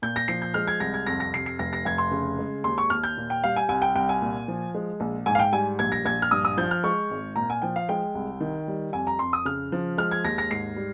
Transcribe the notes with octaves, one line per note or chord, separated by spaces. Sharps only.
A#2 G6
A#6
F3 C7
G6
G#3 F6
G#6
C2 A#6
G#6
F2 A#6
A#6
C3 C7
C7
F1 A#6
A#6
F1 G#6
C6
C#3
G#3
D#2 C6
C#6
D#2 F6
G6
A#2
G5
G3 F5
G#5
C2 G#5
G5
C2 G5
G#5
A#2
F3
G#3
A#1
G#2 G#5
F5
G5
G3 G#5
A#1 G#6
A#6
A#1 G#6
F6
G2 D#6
D#6
F3 G6
F6
G#3 C#6
G#1
A#2 A#5
G#5
F3 G5
F5
G#3 G5
C2
D#3
G3
F2 G#5
A#5
F2 C6
D#6
C#3 F6
F3
G#3 F6
G#6
D#2 A#6
A#6
G#2 C7
G3